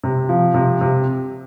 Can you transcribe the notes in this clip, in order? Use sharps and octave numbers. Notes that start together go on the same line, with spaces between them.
C3
F3
C3
C3